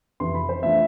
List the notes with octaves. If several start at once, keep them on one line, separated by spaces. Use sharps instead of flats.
F2 C3 E3 B3 C6
B5
C5
E3 A3 D4 F4 E5